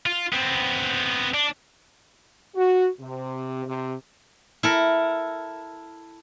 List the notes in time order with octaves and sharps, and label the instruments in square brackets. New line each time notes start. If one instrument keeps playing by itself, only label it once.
[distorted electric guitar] F4
B3 C4
D4
[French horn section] F#4
C3
C3
[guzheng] E4 A4 A#4